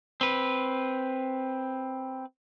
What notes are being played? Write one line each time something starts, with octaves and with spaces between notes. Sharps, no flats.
C4 B4